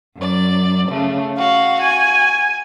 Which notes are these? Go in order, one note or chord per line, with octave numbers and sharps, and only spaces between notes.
F#2 D5
C#3 A3
F#4 F5
G#5